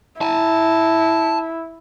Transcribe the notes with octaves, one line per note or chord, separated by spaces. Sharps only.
E4 G#5 A5